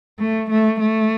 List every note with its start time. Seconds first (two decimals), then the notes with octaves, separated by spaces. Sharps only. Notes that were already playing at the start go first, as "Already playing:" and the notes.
0.19 A3
0.51 A3
0.80 A3